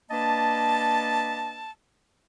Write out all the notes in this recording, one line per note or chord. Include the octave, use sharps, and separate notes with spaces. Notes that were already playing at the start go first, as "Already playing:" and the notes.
A#3 D4 B4 D#5 A5